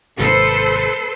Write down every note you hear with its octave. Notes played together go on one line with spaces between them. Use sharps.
G#1 C3 A4 B4 C5